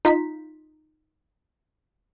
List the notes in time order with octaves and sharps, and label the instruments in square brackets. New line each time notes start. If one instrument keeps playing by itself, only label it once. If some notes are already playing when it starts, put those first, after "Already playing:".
[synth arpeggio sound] D#4 F4 B6